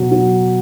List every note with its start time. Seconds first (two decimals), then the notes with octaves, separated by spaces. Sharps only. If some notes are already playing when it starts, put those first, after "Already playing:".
Already playing: B2 F#3
0.12 F#3